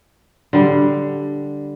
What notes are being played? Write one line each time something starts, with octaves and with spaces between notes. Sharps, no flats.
D3 G3